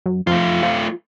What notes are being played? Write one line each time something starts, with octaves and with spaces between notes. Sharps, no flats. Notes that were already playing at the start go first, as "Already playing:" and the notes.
F#2
F2 A3 F4
F3